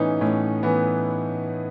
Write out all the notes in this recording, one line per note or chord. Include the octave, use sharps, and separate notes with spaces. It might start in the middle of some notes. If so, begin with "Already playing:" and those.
Already playing: A2 E3 B3 C#4 D#4
A2 C#4
E3 B3